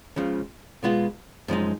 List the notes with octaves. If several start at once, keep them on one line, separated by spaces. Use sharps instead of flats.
C#2 C#3 F3
B2 G#3 B3 F4
F#2 F3 G#3 D#4